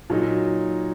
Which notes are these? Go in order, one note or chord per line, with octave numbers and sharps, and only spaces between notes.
A#2 F#3 D#4